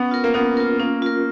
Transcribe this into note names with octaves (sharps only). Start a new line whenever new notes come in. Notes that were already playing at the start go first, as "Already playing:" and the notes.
Already playing: B3 C#4
F4 A#4
A#3
B3 C#4
F4 A#4
A#3 C#4
F4 A#4